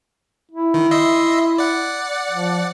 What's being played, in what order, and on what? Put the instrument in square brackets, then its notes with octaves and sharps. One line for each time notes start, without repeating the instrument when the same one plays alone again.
[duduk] E4
[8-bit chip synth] D#3
D#5 E5 C6
D5 F#5
[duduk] F3